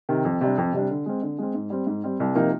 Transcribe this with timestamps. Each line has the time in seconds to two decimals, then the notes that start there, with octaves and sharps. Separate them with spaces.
0.09 C3 D#3
0.25 F2
0.41 C3 G3 D4
0.58 F2
0.73 C3 G3 D4
0.90 D3
1.06 G#3 C4
1.22 D3
1.38 G#3 C4
1.55 G#2
1.70 G3 C4
1.87 G#2
2.04 G3 C4
2.20 C2
2.35 C3 F3 A#3 D#4